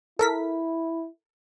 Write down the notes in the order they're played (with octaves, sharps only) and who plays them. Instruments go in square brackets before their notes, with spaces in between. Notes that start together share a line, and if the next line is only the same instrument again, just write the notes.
[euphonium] E4 [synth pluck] A4 A#4 B6